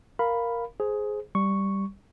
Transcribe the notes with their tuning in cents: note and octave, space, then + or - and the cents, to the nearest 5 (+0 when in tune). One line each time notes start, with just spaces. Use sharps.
A#4 +0 F5 +0 B5 +0
G#4 +10 C5 +0
G3 +0 C#6 +0